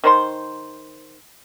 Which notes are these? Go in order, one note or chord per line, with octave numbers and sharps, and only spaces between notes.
D#3 C5 C6